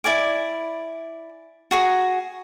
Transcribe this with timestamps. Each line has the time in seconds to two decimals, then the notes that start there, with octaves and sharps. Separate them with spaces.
0.04 E4 D5 G#5 D6
1.71 F#4 G#4 A#5